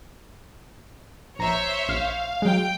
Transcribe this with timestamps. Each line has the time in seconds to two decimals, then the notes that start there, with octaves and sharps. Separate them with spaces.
1.39 A#1 C5 C#5 E5 A#5
1.89 A#1 F5 F6
2.42 F#3 G#3 G5